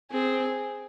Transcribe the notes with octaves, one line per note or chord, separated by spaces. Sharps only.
C4 G#4